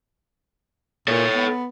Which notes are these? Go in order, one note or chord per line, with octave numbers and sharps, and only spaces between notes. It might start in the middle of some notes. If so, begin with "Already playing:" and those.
A#2 A4 C#5
B3